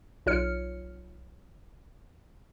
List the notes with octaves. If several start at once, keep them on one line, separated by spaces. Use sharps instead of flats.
B1 F4 C#5 F6 C#7